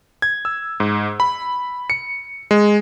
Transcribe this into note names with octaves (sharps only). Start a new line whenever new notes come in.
G#6
E6
G#2
B5
C#7
G#3